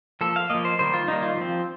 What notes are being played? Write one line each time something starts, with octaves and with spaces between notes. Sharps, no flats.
F3 A#3 A4
F5
F3 A#3 D#5
C5
D#3 G3 A#3 C5
F4
D#3 G3 A#3 D#4
F4
F3 C4